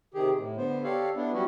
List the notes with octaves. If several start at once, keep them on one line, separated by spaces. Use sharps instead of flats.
C3 D#3 G4 G#4
A2
D3 B3 C5
G4 A4 C#5 D5 F5
B3 D4 E4
F#3 G3 C#4 E4 F#4